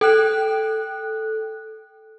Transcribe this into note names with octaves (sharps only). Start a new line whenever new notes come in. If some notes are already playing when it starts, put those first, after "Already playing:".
A4 G5 F#6